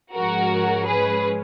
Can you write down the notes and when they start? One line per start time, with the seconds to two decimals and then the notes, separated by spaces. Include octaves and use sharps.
0.14 G#2 F3 G#3 C#4 F#4 A#4
0.87 G#4 B4